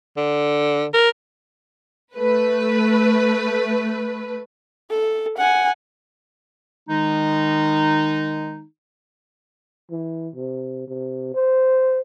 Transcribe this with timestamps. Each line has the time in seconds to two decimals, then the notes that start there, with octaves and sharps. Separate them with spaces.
0.17 D3
0.94 A#4
2.15 A3 B4
4.90 A4
5.38 F#5 G#5
6.89 D#3 G#3 D#4
9.91 E3
10.35 C3
10.88 C3
11.34 C5